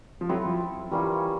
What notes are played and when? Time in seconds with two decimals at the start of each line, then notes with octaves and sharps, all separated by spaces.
0.21 F3
0.29 F#3 C4 E4 A4
0.45 F3
0.91 E3 G3 A#3 C#4 F4